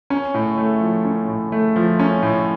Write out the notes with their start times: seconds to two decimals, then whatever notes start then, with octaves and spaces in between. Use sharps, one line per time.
0.10 C#4
0.34 A2
0.58 A3
0.81 F3
1.05 C#4
1.28 A2
1.52 A3
1.76 F3
1.99 C#4
2.22 A2